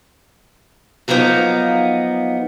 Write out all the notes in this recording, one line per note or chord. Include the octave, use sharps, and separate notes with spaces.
F3 F#3 A#3 B3 D#4